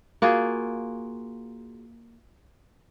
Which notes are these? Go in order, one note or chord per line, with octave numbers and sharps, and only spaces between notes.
A#3 F4 F#4 G#4